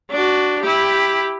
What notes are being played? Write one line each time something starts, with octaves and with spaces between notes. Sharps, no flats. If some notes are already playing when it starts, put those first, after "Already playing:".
D4 F#4
E4 G4